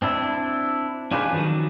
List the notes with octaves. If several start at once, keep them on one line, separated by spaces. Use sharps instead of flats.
C4 D4 E4
C#4 D4 F4 G4 G#4 B4
D#3 F3 F#3